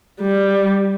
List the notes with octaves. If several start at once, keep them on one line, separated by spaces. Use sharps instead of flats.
G3